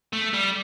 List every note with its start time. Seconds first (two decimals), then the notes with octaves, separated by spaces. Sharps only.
0.13 A3
0.34 G3